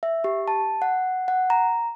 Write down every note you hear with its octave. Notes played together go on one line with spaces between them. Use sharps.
E5
G4
A5
F#5
F#5
A#5